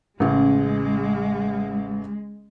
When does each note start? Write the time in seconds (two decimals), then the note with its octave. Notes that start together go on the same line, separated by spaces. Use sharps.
0.20 A1 C#3 G#3